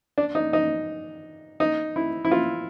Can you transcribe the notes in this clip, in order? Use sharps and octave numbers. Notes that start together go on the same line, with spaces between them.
D4
D#4
D#4
D#4
E4
E4
F4